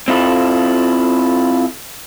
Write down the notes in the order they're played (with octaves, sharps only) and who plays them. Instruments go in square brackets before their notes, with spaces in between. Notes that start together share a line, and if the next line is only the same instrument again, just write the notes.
[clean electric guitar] C4 E4 F4 A4